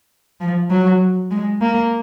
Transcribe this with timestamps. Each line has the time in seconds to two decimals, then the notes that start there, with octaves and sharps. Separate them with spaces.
0.41 F3
0.70 F#3
1.31 G#3
1.61 A#3